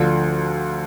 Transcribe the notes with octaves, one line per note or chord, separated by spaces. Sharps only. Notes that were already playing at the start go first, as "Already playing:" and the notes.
Already playing: D2 D3 F3